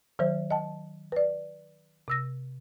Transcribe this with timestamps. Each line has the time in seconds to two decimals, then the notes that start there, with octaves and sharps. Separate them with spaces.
0.19 D#3 F#3 C5
0.51 D#5 G5 A5
1.12 B4 D5
2.08 C3 E6 A#6